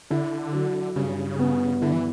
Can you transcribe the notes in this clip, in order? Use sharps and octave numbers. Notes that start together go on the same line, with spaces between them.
D3 E4
F#3
G2 C#3
B3
D3 E4
E3